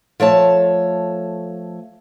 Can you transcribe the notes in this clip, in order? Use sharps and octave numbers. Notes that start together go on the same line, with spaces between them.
F3 A3 C#5 A5